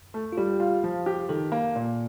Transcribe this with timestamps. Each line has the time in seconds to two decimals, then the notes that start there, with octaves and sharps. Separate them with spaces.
0.14 A3
0.33 F4
0.37 G3 G4
0.60 F4
0.84 F3
1.06 G4
1.29 D#3 A4
1.52 A#3
1.76 A#2